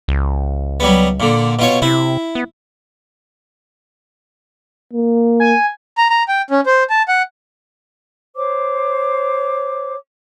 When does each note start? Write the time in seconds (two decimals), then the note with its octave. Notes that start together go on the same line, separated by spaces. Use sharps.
0.08 C#2
0.80 F#3 G3 B3
1.20 A#2 D3
1.59 B2 F4 C#5
1.82 C3 E4
2.35 B3
4.93 A#3
5.40 G#5
5.98 A#5
6.10 A#5
6.28 G5
6.51 C#4
6.66 C5
6.90 A5
7.08 F#5
8.36 C5 C#5 D6